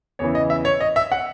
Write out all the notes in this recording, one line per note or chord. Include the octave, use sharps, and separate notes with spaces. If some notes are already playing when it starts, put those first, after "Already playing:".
E2 C#3 E3 C#5
D#5
E5
C#5
D#5
E5
F#5